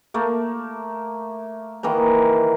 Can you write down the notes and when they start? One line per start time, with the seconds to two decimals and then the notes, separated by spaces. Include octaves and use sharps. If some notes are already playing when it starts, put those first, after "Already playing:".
0.14 A3 A#3
1.83 D#3 E3 A#3 A#5